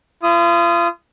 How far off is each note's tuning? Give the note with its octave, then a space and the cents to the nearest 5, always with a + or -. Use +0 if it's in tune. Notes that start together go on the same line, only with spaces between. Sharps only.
F4 -40 D#6 +0